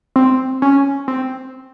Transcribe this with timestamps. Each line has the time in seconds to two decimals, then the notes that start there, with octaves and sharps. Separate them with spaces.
0.16 C4
0.62 C#4
1.08 C4